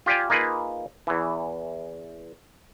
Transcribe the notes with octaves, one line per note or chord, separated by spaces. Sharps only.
F4 G4 D5 G5 G#5
A#3 D#4 F4 G#4 A#4 B4
E2 E3